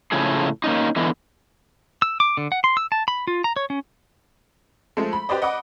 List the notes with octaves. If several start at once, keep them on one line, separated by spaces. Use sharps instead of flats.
A2 C#3 F3 A3 G#4
A#3 C#4 D#4
D3 E3 G#3 B3
E6
D6
D3
F#5
C6
E6
A5
B5
F4
A#5
C#5
C#4
F3 G#3 A3
B5
G4 B4 C5 D5 D#5
D#5 F#5 B5 D6